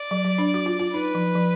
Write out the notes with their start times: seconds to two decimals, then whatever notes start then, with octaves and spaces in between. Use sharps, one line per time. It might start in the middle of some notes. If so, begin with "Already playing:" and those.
Already playing: D5
0.11 F#3
0.25 F#3
0.38 D4
0.54 F#4
0.66 F4
0.80 F4
0.94 D#4 B4
1.15 F3
1.35 F3